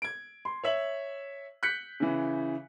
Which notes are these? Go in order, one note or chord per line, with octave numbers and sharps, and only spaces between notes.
G#6 D7
C6
C#5 E5 F#7
F#6 G6 B6 C#7
C#3 E3